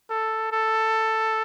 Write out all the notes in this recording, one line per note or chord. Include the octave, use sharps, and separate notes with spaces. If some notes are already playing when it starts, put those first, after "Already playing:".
A4
A4